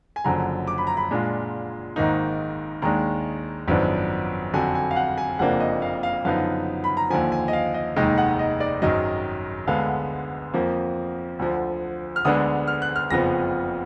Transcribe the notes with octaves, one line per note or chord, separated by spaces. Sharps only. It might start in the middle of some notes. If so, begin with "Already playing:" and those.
G#5
F#1 F#2 D3 F3 A#5
D6
B5
A#5
B5
A#2 G#3 D4 F4
G#1 G#2 D#3 A#3 D#4
D#2 D#3 G#3 D4 A#5
G#1 F#2 F3 B3 D4
F2 D3 F#3 G#5
G#5
F5
F#5
G#5
F#1 F2 F3 A#3 D4 F#5
D#5
F5
F5
F#2 D3 F3 B3 D#4 F5
B5
A#5
D#2 D3 F3 G#5
G#5
D#5
F5
D#5
F1 D#2 D#3 G#3 D#4 D#5
F#5
D#5
D5
G#1 F#2 D#3 F#3 D#5
D2 D3 G#3 B3 F5
F2 F3 A#3
D2 D3 F3
F6
D2 D3 G#3 B3 D4 D#6
F6
F#6
F6
F#1 F2 F3 B3 F4 A#6